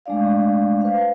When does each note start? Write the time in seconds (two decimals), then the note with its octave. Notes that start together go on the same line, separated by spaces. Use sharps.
0.06 G#3 A3 D4 D5 F5
0.81 B4 C5 F5